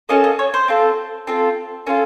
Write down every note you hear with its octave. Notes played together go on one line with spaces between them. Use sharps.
A#3 C#4 F#4 A4 D#5
D#5
C#5
C5
C4 F4 A4
C4 F4 A4
C#4 F4 A4 A#4